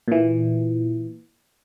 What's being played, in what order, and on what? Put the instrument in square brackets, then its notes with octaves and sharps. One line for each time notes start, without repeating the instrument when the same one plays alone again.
[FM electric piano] A#2 E3